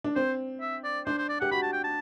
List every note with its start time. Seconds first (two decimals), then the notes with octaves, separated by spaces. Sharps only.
0.04 D4
0.16 C4 C5
0.61 E5
0.84 D5
1.06 D4 C5
1.18 C5
1.29 D5
1.40 G4 F#5
1.51 F#4 B5
1.63 A5
1.73 G5
1.84 A5